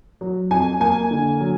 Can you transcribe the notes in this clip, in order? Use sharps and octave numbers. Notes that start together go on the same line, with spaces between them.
F#3
F2 G#5
A#3 G#5
D3
F#3